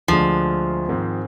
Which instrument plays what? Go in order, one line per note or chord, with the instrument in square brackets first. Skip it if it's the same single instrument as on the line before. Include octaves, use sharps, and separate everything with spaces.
[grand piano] D2 D3 G#3 D4 [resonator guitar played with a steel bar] F3
[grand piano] G#2 D#3 G#3 C4